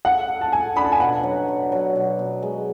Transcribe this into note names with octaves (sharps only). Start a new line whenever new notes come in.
A4 F#5
A4
A5
A3 G#5
D4 B5
A5
G#5
B2 F#5
F#3
F#4
F#3
B2
B2
G#3